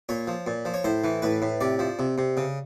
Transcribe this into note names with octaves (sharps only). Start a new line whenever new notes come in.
A#2 C#5
F3
A#2
F3
C#5
A2 C5
E3
A2 B4
A2
C3 D5
F3
C3
C3
C#3